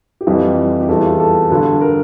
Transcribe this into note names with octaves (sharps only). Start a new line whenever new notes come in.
G4
F2 E3 G3 F4
G4
E2 E3 G3 A4
F4
A4
G2 D3 G3
A#4